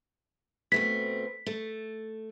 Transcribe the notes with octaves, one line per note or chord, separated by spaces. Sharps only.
B2 A3 C4 B6
A3